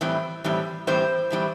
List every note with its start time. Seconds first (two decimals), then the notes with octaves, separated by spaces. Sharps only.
0.01 A2 E3 G3 C4
0.44 A2 E3 G3 C4
0.87 A2 E3 G3 C4 C5
1.30 A2 E3 G3 C4